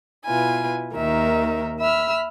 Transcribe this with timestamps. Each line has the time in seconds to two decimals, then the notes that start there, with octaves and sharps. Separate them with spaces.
0.25 B2 E4 F4 B4 G#5
0.94 D#2 D#3 A#4 E5
1.79 E5 B5 E6 F6